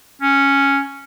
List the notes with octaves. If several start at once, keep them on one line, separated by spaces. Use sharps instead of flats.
C#4